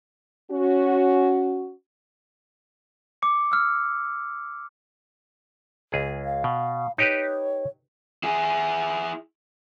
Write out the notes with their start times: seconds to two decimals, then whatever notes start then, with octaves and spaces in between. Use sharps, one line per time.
0.51 C#4 F#4
3.22 D6 C#7
3.52 E6 F6
5.92 C#2 G#4
6.25 F5
6.44 B2
6.98 D#4 G4 B4 C#5
8.23 E4 G#4